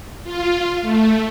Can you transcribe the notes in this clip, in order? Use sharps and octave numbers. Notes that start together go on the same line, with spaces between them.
F4
A3